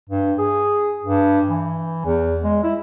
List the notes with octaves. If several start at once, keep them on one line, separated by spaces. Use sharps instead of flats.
G2
G#4
G2
E3
E2
G#3
E4